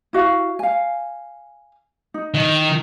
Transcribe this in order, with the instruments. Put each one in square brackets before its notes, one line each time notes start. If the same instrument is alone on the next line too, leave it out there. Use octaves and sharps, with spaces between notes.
[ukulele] E4 F#4 F5
F5 G#5
D#4
[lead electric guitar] D#3